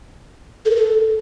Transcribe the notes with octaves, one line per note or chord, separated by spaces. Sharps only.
A4
A#4
A4